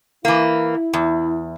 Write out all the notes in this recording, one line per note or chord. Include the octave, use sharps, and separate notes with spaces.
E3 A#3 E4
E2